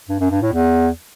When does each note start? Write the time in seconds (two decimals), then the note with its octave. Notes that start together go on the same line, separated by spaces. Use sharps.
0.09 G2
0.20 F#2
0.31 G2
0.42 A2
0.53 E2